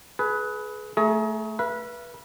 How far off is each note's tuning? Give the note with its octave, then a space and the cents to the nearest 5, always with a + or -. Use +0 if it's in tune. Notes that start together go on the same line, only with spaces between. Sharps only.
G#4 +30 B4 +0
A3 +0 G#4 +35 A#5 +25
B4 -25 E5 +40